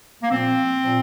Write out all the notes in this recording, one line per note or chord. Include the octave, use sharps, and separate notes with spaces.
A#3
A#2 F3 C4
A#2 F3